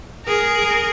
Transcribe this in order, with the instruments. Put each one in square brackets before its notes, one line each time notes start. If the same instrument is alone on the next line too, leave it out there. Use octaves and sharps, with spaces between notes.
[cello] G#4 A#4